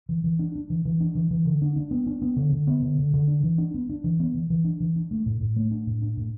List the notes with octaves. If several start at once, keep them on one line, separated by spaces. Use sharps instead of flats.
E3
E3
D4
D4
E3
E3
D4
E3
E3
D3
D4
D4
B3
D4
B3
D3
D3
B3
D3
D3
D3
D4
E3
D4
B3
D4
E3
B3
E3
E3
D4
E3
D4
A3
A2
A2
A3
D4
A2
D4
A2